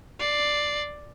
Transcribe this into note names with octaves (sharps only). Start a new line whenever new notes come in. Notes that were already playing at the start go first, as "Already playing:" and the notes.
D5 C7